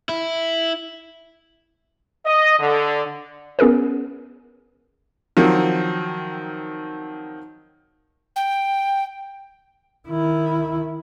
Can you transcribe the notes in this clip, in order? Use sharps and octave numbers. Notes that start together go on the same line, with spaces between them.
E4
D#5
D3
B3 C#4 G#4 A#4 B4
D#3 F3 F#3 C4
G5
D#3 E4